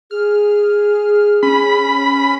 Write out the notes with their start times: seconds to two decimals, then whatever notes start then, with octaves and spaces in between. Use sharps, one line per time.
0.11 G#4 F6
1.43 C#4 B5